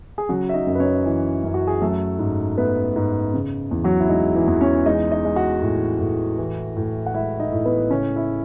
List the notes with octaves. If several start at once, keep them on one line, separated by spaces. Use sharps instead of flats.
G#4
C#3 F#3 F#4
E5
D#4 D#5
F#2
B4
C#4 C#5
E3
F#2
F#4
G#4
F#3 A3 A4
G#2
A3 B3 B4
G#2
C#3
E2
F#3 F#4
E4
G#3 D#4
E3 E4
E2
C#4 C#5
G#3 D#4 D#5
D#4 D#5
G#3
F#4 F#5
A2
A2
E3
A2
F#5
G#3 E4 E5
D#4 D#5
A2
B3 B4
C#3 C#4 C#5
E4 E5